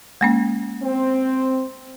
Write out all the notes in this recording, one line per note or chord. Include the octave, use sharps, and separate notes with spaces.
G#3 A#3 C#4
C4